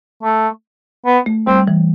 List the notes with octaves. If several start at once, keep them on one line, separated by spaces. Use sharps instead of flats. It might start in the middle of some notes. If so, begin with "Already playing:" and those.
A3
B3
A3
G3 C4
E3